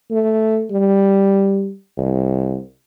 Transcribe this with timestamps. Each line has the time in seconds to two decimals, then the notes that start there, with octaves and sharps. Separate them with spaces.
0.11 A3
0.71 G3
1.98 C2